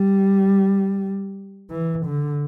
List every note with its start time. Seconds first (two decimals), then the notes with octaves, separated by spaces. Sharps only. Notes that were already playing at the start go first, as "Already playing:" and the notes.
Already playing: G3
1.71 E3
2.06 D3